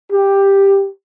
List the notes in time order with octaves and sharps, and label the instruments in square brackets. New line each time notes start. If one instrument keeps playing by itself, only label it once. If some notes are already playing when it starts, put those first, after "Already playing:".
[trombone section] G4